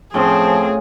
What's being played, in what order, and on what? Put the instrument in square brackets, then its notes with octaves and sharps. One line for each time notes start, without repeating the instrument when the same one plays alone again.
[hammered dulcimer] A2 C#4 F4 [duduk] F3 [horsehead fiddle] C4 [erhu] G#4